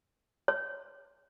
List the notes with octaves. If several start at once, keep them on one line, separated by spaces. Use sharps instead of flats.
C#5